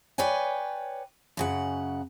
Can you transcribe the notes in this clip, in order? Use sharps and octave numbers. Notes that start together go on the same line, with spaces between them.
B4 C#5 D5 G5 G#5
F#2 C#3 F#5